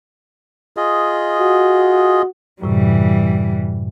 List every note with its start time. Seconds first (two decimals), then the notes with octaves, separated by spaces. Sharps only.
0.77 F4 G#4 D#5
1.40 F#4
2.62 F#2 A2 C3 E3 G3